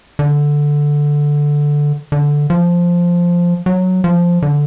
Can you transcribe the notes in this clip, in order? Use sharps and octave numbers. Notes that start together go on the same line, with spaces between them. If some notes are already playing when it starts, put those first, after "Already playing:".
D3
D3
F3
F#3
F3
D3